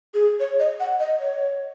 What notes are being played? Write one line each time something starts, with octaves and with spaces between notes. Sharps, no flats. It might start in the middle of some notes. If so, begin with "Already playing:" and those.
G#4
C#5
D#5
F#5
D#5
C#5